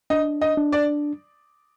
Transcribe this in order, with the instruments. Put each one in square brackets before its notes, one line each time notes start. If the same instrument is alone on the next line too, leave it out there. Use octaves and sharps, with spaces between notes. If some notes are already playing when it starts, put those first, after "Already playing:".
[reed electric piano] D4 [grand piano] D#5
[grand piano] D#5
[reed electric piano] D4
[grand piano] D5